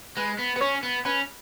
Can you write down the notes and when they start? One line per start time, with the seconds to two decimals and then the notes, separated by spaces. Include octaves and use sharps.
0.17 G#3 B4
0.39 B3
0.56 B3 B4
0.61 C#4 C#5
0.83 B3
1.05 C#4 B4